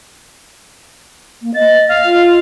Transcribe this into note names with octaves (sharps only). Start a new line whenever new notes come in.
A#3
D#5 A6
F5
F4